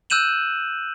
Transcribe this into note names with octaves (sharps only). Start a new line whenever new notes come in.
E6 F#6 G6 D#7 E7 F#7